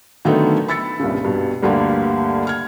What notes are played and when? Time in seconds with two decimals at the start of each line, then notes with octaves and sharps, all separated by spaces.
0.25 D3 D#3 F#3 A3 B3 D#4
0.68 B5 E6 A6 B6 C#7
1.00 C2 G2 A#2 C#3
1.24 G2 B2
1.63 D2 G2 D3 G3 A#3
2.47 F6 G#6